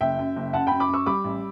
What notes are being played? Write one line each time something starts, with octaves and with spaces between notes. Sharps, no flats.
F#1 E5 G5
F#2
F#1
F#2 F#5 A5
F#2 G5 B5
B5 D6
F#2 C#6 E6
G3 B5 D6
A1